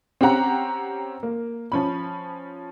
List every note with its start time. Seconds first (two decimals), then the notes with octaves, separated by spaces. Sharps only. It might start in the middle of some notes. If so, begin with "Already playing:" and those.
0.21 C4 C#4 G4 F#5 A#5
1.23 A#3
1.72 F3 C#4 B5